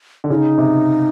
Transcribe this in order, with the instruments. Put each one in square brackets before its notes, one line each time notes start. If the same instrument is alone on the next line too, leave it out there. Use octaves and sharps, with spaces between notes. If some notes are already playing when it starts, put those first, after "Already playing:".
[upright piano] D3
[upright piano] C#3 [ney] E4
[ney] D#4
[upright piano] C3